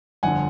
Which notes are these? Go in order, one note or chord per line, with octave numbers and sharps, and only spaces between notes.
G1 F2 D3 F#5 G#5